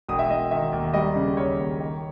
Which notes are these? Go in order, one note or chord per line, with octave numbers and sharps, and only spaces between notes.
E1 D#6
E5
E1 D#5
D#3 E5
D#2
G3 D#5
C#3
D#2 C#5
D#2
D#3